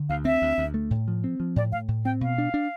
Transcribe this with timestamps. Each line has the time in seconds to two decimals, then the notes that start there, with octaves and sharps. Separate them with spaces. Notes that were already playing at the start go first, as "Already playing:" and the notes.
Already playing: D3
0.09 D2 F5
0.25 C4 E5
0.42 D2
0.58 D2
0.74 A3
0.91 A2
1.08 F3
1.24 C4
1.40 F3
1.56 A2 D5
1.72 A2 F5
1.88 A2
2.05 C4 G5
2.21 B2 F5
2.38 D4
2.54 D4